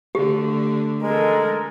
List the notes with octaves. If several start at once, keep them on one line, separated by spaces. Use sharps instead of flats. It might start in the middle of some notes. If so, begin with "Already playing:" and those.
D3 A3 G4
G#3 A4 A#4